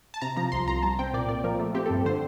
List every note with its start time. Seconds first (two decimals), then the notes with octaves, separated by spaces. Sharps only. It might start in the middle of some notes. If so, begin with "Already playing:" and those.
0.14 A5
0.21 C3 A#5
0.37 F3 A#5
0.52 C2 C6
0.68 C2 A#5
0.83 G3 A5
0.99 C4 G5
1.13 A#2 D5
1.29 A#2 D5
1.44 F3 A#4
1.60 A3
1.74 C4 G4
1.86 A4
1.90 G2
2.05 D3 C5